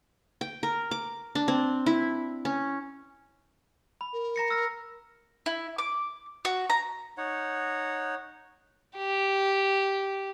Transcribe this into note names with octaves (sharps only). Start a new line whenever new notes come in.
G5
A#4
D6
D4
C4
E4
C#4
B5
A#4
A#5 A#6 C#7
E6 F6 A#6
E4
D6
F#4
A#5
D#4 C#5 F#5
G4